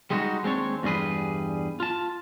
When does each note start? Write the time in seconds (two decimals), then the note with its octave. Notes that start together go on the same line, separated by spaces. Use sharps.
0.10 G3 G#3 B3 D#4 F#4
0.43 D#2 G#3 C4 D4 C#5
0.83 E2 G2 G3 G#4 B4
1.80 F4 A5